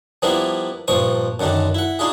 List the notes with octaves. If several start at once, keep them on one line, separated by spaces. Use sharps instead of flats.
F3 G3 A#3 B3 D4 E4
A#1 G2 F3 C#6 D#6
F#2 D3 D#3 D4
E4 F#5
D4 D#4 F4 G#4